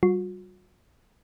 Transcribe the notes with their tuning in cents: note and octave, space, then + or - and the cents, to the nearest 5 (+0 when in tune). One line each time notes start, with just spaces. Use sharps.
G3 -30 F#4 -45